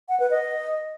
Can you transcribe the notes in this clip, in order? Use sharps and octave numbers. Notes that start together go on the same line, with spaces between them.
F#5
B4
D#5